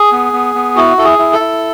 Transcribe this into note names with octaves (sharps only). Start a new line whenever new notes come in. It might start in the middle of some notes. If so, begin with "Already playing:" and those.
Already playing: G#4
B3
B3
B3
E4 F#4
E4 A4
G#4
E4
A4
E4